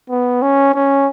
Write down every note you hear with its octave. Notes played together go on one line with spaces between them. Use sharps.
B3
C#4
C#4